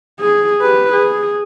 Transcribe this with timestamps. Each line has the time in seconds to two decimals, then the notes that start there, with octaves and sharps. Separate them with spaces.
0.20 G#4
0.61 G4 B4
0.92 G#4